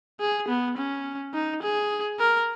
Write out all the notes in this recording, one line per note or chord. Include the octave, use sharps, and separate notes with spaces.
G#4
B3
C#4
D#4
G#4
A#4